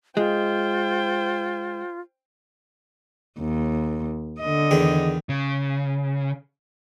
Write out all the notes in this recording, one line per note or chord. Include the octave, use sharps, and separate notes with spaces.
G#3 F4 C5 G5
D#2
D3 D#5
E2 D#3 G#4
C#3